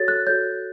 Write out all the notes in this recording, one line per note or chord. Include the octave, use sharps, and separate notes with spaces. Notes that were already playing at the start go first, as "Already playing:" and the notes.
Already playing: F#4 A4 C#5 A6
F#6
F#4 A4 C#5 G6